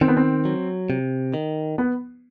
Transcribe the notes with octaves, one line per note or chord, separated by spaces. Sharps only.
D#3 C4
B3
C4
F#3
C3
D#3
B3